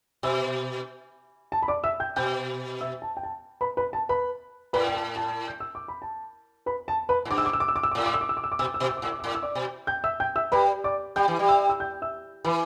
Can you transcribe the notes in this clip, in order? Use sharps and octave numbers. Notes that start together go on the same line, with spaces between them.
B2 E5 E6
A5
B5
D5 D6
E5 E6
G5 G6
B2 G5 G6
E5 E6
A5
G5
A5
B4 B5
B4 B5
A5
B4 B5
A2 B4 B5
G5
A5
A5
G6
E6
D6
B5
A5
B4 B5
A5
B4 B5
A2
G2 D6
E6
D6
E6
D6
E6
D6
E6
D6
A2 E6
D6
E6
D6
E6
D6
E6
D6
B2 E6
D6
E6
B2 D6
E6
D6
A2 E6
D6
E6
A2 D6
E6
D5 D6
B2
G5 G6
E5 E6
G5 G6
E5 E6
G3 B4 B5
D5 D6
G3 G5 G6
E3
G3
E5 E6
E6
G5 G6
E5 E6
E3 B4 B5